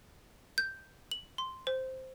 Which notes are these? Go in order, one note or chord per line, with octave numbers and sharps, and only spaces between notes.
G6
F#7
C6
C5